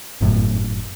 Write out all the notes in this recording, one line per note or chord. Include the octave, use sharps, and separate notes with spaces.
G1 F#2 A2